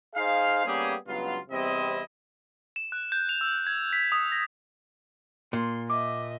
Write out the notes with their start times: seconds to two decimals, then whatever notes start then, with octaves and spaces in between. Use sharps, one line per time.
0.15 D#4 G#4 C5 F5
0.66 G3 A#3 B3 C#4 G4 G#4
1.07 C#2 G2 F#3 B3 F4
1.51 E2 C3 G3 C4 E4 D#5
2.76 E7
2.92 F#6
3.12 G6
3.29 F7
3.41 E6
3.67 G#6
3.93 B6
4.12 D#6
4.32 A#6
5.53 A#2 C6
5.90 D#5 E5 D6